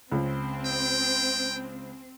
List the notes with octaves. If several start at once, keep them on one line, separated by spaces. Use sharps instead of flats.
C#2 C4
G5